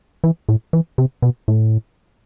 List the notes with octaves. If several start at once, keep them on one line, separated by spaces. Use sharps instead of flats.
E3
A2
E3
C3
B2
A2